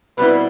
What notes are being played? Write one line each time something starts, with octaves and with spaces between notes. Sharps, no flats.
B2 G3 C4 E4 B4